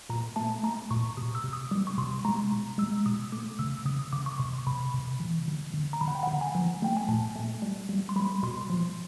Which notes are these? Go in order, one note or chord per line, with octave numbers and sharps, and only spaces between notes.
A#2 A#5
A3 A5
A3 A#5
A#2 C#6
C3 D#6
E6
C3
D#6
G3 D6
C#6
C3 C6
G#3 A#5
B2
G#3 E6
B2 D#6
A3 D6
C#3 E6
C#3 D#6
D#6
C#3 D6
C#6
C3 C6
C3 B5
C3
E3
D3
D3
A#5
D3 B5
F#5
G5
F#5
D3 G5
G#5
F3
A3 G5
G#5
A#2 A5
A3
G3
G3
C6
G3 B5
B2 C6
F3